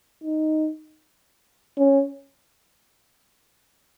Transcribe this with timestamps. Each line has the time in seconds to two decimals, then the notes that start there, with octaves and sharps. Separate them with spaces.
0.24 D#4
1.78 C#4